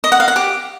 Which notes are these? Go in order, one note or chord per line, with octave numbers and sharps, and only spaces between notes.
D#5
F#5
F5
F#5
G4